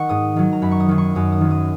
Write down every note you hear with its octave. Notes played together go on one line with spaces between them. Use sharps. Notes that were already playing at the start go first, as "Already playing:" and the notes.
Already playing: D#3 D#5 F#5 C#6
G#2 D#6
D#3 F#3
A#5
F#2 B5
C#6
D#6
D#3 F#3
C#6
F#2 D#6
D#6
D#3 F#3
D#6